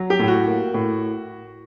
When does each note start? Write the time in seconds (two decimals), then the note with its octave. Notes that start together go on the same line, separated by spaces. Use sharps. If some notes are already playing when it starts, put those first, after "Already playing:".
Already playing: F#3
0.10 G4
0.19 A2
0.28 F#4
0.47 A#3
0.74 A2